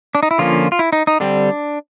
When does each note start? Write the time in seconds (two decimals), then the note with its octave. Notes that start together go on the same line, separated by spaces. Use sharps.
0.15 D4
0.23 D#4
0.31 E4
0.38 D3 F3 A#3 C#4 F4
0.72 F4
0.79 E4
0.93 D#4
1.07 D#4
1.20 D3 G3 C4 D4